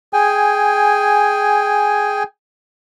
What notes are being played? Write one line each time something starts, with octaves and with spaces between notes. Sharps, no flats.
G#4 G5 G#5